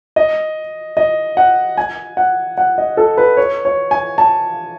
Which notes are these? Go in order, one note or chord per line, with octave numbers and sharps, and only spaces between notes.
D#5
D#5
F#5
G#5
F#5
F#5
D#5
A4
B4
C#5
C#5
G#5
A5